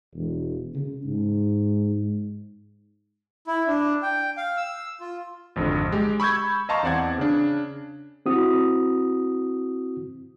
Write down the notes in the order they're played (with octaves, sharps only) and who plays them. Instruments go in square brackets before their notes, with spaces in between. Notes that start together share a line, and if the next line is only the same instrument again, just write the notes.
[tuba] E1
C#3
G#2
[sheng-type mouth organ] E4
D4
G5
F5
E6
F4
[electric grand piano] G#1 F2 D3
G#3 G4
B5 C#6 E6 G6 G#6
D#5 F5 A5 A#5 C6 C#6
E2 C4 D5 F#5 G#6
C#3 D4
[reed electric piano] C4 E4 F#4 D#6